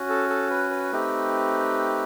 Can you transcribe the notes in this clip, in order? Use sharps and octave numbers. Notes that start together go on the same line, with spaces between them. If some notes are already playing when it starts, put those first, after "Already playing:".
Already playing: C#4 F#4
A4
A4
B4
B4
A3 C4 D#4 G4